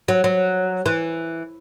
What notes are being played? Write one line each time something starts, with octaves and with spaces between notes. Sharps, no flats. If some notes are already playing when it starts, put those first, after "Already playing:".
F#3
F#3
E3